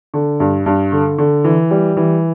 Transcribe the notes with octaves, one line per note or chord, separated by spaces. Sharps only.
D3
G2
G2
D3
D3
E3
G3
E3